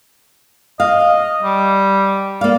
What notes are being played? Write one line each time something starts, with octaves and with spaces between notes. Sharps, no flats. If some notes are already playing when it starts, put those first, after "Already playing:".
D#5 F5
G3
A#3 D5 F5